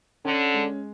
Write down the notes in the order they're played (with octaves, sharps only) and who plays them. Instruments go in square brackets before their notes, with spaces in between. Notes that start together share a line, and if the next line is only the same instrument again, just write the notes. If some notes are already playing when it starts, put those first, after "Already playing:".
[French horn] D3 [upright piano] C#4
[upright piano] G#3